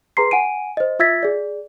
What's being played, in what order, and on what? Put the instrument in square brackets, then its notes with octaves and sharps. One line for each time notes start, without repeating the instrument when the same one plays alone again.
[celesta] G#4 B4 A#5 C6 C7
F#5 G#5 D7 D#7
C5 D#5
F4 E5 E6 G#6 A6 B6
G#4 D5